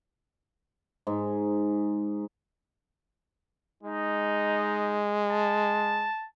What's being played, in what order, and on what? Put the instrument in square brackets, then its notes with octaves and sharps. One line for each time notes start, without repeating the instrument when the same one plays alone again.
[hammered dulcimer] G#2
[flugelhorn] G#3 [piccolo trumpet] D#4
[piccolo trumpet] A5